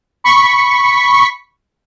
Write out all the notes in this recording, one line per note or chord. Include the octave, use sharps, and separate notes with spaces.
B5 C#6 B6